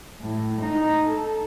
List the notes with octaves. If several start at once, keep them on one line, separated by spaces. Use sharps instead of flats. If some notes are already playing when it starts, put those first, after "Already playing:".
A2
D#4
A4